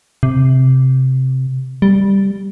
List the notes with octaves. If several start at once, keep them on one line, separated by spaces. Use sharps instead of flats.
C3
G3